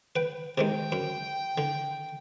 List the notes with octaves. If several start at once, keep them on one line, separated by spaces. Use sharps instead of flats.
B4 G5
C3 D#3 G#3 G5
F#2
D3